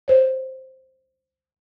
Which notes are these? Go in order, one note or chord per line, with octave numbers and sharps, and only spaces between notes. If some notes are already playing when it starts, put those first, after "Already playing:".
C5 C#5